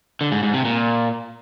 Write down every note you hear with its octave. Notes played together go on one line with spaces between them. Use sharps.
D3
G#2
G#2
C3
A#2